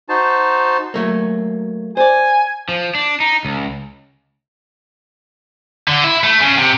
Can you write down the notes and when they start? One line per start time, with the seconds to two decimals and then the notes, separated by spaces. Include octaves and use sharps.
0.09 D#4 F#4 C5 A5
0.94 F#3 A3 A#3
1.97 C5 D5 G#5
2.69 F3
2.95 D4
3.20 D#4
3.45 C#2
5.88 D3
6.04 E4
6.24 A3
6.41 C#3
6.58 C3